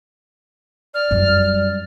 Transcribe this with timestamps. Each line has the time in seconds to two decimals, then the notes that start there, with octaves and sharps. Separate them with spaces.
0.94 D5 F6
1.11 F#2 G3